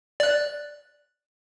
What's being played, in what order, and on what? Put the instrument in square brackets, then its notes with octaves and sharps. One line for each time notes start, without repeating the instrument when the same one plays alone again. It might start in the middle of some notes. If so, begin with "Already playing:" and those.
[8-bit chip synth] D5 F#6